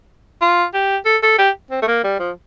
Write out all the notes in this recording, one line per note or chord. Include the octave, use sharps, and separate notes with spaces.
F4
G4
A4
A4
G4
C4
A3
A#3
G3
F3